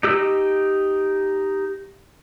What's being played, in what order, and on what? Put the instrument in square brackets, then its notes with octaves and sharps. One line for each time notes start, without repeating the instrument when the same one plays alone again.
[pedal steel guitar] D#4 G4 E6